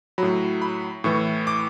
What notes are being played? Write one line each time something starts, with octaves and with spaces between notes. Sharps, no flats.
A2 F#3 B5
B5
A2 E3 C#6
D6